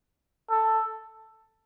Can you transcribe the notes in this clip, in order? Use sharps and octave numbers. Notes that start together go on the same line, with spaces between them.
A4